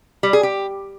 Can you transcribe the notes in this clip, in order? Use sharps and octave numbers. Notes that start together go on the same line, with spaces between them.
G3
G#4
G4